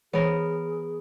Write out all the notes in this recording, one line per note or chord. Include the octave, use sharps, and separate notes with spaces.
E3 B3 G#4 A#4 C5 C#5